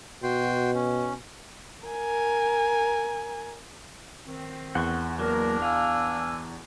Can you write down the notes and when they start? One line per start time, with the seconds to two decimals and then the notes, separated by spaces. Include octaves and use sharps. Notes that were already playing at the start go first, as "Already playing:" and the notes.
0.23 B2 F#4 G5 C6
0.75 C#4
1.87 A#4 G#5
4.26 D#3 C4
4.75 E2 F#5 C6 C#6
5.19 F#3 A#3 D4 A#4
5.62 F5 G#5 E6